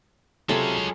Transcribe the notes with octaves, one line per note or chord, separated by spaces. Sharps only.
C3 F#3 G#3 C#4 F4 G#4 A4 B5